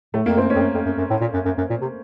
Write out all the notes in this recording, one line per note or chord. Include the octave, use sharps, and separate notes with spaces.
A2 A3
F2 A#3
F#2 C4
C#4
F2
F#2
F2
F#2
F#2
A2
A#2
F#2
F#2
F#2
A#2
C3